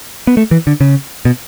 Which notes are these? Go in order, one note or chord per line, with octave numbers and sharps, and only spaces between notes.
B3
A3
E3
D3
C#3
B2